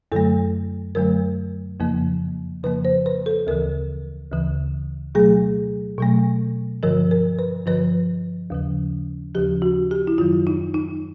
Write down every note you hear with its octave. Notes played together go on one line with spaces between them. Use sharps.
F#2 D3 F#3 A3 A4
F#2 D3 F#3 A3 A#4
F2 C#3 F3 A#3
F2 C#3 F3 A#3 B4
C5
B4
A4
D2 C#3 E3 A#4
D2 C#3 E3
B2 F#3 A3 G#4
B2 F#3 A3
G2 D3 F3 A#4
A#4
B4
G2 D3 F3 B4
D#2 C#3 F3
D#2 C#3 F3 G4
F#4
G4
E4
F#2 D#3 F#3 F4
D#4
D#4